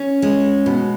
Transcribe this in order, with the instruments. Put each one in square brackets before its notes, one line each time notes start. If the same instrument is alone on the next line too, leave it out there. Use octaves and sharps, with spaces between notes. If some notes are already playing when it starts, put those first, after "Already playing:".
Already playing: [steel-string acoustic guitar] C#4
G#3
B2